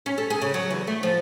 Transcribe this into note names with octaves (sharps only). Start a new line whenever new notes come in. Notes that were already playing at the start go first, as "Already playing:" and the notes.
C#4
A4
G#4
C#3
F#3
E2
A3
F3